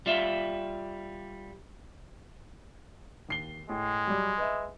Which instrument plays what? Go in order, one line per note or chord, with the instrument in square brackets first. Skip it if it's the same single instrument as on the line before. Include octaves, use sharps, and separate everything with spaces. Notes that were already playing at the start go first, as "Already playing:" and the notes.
[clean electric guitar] G3 F4 E5
[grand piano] D#2 C7 G7
[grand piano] A2 [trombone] G#3
[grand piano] F#3 G3
B4 D#5 E5